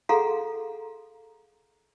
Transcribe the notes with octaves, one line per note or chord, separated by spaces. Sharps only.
G#4 A4 F5 F#5 A#5 C6